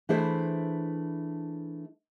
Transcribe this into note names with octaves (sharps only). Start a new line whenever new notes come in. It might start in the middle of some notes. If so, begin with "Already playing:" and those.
E3 A3 D4 E4 G#4 C5